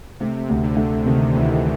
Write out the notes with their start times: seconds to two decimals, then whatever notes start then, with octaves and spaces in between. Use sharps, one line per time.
0.20 C3 A3
0.49 D2
0.63 D3
0.77 A3
1.06 C3 D#3
1.34 D2 E3